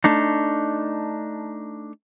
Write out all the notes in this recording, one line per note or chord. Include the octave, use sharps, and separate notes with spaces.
A3 D4 D#4